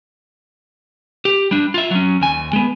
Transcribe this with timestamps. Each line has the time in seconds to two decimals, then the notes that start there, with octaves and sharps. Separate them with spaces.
1.25 G4
1.51 G3 D4
1.74 F4 E5
1.91 F#3 C#4
2.21 D#2 G#5
2.53 G#3 B3